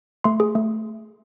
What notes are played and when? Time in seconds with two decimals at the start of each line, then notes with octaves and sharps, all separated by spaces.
0.24 A3 C6
0.40 G#4
0.55 A3